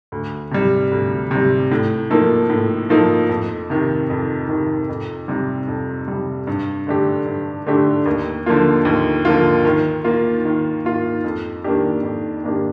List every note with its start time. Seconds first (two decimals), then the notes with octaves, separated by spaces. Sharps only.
0.12 D2
0.51 C3 G3
0.92 D2
1.31 C3 G3
1.72 A2
2.10 F3 A#3 D#4 A4
2.50 A2
2.90 F3 A#3 D#4 A4
3.29 F2
3.70 C3 D#3
4.10 F2
4.49 C3 D#3
4.89 F2
5.28 C3 G3
5.68 F2
6.08 C3 G3
6.47 G2
6.87 D3 A3 D4 G4
7.26 G2
7.67 D3 A3 D4 G4
8.06 D#2
8.46 D3 F3 A#3 F4
8.85 D#2
9.25 D3 F3 A#3 F4
9.65 D#3
10.04 A#3 F4
10.45 D#3
10.85 A#3 F4
11.24 F2
11.64 D#3 A#3 D4 G4
12.03 F2
12.44 D#3 A#3 D4 G4